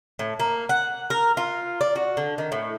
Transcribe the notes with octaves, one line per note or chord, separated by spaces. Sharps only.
A2
A#3
F#5
A#4
F4
D5
F#4
D3
D#3
A2